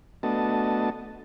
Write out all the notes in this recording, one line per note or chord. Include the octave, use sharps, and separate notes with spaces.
A3 B3 D4 F#4 D#5 A5